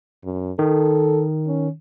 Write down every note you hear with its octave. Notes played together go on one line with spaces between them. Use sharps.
F#2
D#3 A4
C#4